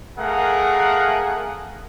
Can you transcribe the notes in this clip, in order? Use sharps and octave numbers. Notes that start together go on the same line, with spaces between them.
A3 G#4 A#4 F5 F#5